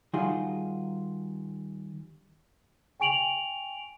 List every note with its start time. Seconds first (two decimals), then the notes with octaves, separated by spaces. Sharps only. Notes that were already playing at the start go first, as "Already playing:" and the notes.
0.14 D#3 G3 D#4 F4 F#4 G#4
3.00 G5 G#5 C#6 D7 F7 F#7